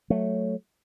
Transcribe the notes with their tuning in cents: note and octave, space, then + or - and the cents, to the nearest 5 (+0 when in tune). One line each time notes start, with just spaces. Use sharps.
F#3 +0 A3 +0